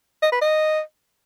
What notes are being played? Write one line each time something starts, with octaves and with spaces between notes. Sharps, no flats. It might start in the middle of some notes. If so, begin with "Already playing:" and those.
D#5
B4
D#5